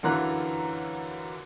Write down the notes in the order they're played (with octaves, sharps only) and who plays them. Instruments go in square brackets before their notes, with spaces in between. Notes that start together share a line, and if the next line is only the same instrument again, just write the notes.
[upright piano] F#2 D3 E3 F4 A#5 F#6